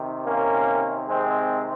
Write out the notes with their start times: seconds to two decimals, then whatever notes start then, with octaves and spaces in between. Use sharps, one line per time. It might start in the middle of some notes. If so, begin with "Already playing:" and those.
Already playing: C3 D#3
0.26 A#3 C#4
1.07 G#3 C4